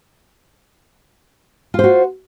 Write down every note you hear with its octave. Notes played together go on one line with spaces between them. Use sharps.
F4 F#4 C5